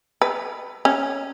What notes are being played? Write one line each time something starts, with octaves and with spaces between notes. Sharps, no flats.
B4
C#4